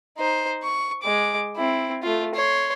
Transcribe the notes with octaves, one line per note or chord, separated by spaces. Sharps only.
D#4 C5
C#6
G#3 D6
C4 E4
A3 F4
C#5 C6